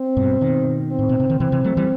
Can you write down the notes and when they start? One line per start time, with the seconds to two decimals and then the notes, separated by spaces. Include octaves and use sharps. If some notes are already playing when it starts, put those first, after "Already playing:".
Already playing: C4
0.17 G2 B2
0.41 B2 D#3
0.91 C4
0.99 A2
1.09 B2
1.20 C3
1.30 D#3
1.40 C3 E3 C4
1.52 C3 E3
1.64 F#3 A3
1.77 E3 G3